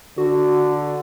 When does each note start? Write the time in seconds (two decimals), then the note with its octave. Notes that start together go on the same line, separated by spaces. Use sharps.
0.18 D3 F#4